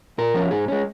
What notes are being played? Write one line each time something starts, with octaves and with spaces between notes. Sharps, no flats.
A#2 A#4
F3 C#4
G#2 G#4
G#3 C#4